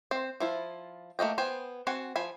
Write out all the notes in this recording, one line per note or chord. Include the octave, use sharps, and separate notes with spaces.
C4 C5
F3 E4 F4
A3 A#3 D#5 G5
B3 C5 G5 G#5
C4 F#4 F#5 G#5
F3 C5 G#5 B5